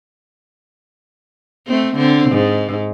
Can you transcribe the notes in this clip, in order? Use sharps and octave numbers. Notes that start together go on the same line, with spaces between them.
A3 C4
D3 C4
G#2